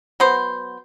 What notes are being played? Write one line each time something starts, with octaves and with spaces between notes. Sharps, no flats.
F#3 B3 C5